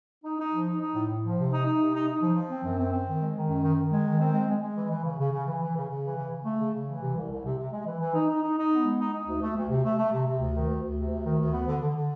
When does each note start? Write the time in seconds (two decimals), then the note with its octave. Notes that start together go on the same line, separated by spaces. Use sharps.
0.24 D#4
0.38 D#4
0.53 F3
0.67 D#4
0.80 D#4
0.95 A2
1.09 A2
1.23 F3
1.37 C3
1.51 D#4
1.65 D#4
1.79 C3
1.94 D#4
2.08 D#4
2.22 F3
2.35 F3
2.50 C4
2.64 F#2
2.78 C4
2.92 C4
3.07 D#3
3.21 G#3
3.34 D#3
3.48 F#2
3.62 D#3
3.77 D#3
3.92 G#3
4.05 D#3
4.20 C4
4.33 G#3
4.48 G#3
4.62 G#3
4.76 E3
4.89 E3
5.04 C#3
5.19 C#3
5.32 C#3
5.46 E3
5.61 E3
5.75 C#3
5.89 C#3
6.03 E3
6.17 C#3
6.31 C#3
6.44 A3
6.59 C#3
6.73 C#3
6.87 E3
7.02 C3
7.15 C2
7.30 C2
7.44 C3
7.58 C3
7.72 G#3
7.86 E3
8.00 E3
8.14 D#4
8.28 D#4
8.42 D#4
8.56 D#4
8.71 B3
8.84 G#3
8.99 D#4
9.13 D#4
9.27 D2
9.42 A3
9.56 D2
9.69 C3
9.84 A3
9.98 A3
10.12 C3
10.26 C3
10.40 D2
10.54 D#3
10.69 D2
10.82 D2
10.96 C3
11.10 D2
11.25 D#3
11.39 D2
11.53 B3
11.67 D3
11.81 D3
11.96 D3